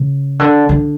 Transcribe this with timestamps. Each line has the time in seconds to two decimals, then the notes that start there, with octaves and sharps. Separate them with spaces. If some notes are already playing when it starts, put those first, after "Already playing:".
Already playing: C#3
0.39 D3
0.69 D3